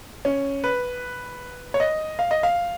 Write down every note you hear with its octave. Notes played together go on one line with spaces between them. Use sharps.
C#4
B4
C#5
D#5
F5
D#5
F5